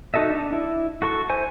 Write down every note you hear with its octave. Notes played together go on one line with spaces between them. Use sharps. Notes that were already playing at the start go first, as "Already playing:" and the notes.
D#4 F#4 A4 D#5 E5
D4
E4
F#4 A4 C6 C#6
E4 C5 G#5